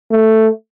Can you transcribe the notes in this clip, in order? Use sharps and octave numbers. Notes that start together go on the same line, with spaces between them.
A3